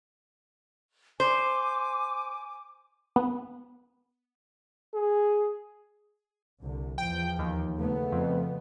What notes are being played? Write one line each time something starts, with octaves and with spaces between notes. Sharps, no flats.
C5 G#5 D6
B3
G#4
C2 D3
E2 F3 G5
D#2
C#3 A3 B3
F2